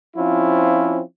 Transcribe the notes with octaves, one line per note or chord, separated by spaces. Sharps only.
F3 C4 C#4 E4 F4